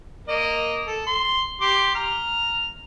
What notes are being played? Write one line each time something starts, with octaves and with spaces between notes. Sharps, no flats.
A#3 D#5
A4
C6
G4 C6 D6
A#5 F6